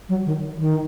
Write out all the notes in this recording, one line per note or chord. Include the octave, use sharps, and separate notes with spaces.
F#3
D#3
D#3